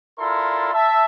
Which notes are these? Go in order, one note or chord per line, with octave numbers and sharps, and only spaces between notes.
E4 F4 A4 A#4 D5 C6
E5 A5